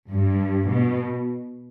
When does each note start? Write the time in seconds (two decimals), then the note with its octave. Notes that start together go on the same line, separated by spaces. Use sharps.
0.10 G2
0.70 B2